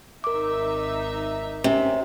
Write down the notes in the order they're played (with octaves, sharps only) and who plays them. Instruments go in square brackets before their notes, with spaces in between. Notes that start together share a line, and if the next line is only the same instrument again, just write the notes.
[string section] G#1 D#4 E5 [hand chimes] A#4 D6
[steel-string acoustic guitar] C3 [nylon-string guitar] C#4